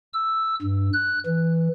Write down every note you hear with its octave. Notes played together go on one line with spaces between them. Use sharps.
E6
G2
F#6
E3